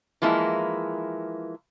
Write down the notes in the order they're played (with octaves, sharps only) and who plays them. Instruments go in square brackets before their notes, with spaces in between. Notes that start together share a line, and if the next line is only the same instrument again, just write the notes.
[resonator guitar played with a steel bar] E3 F3 G#3 A#3 E4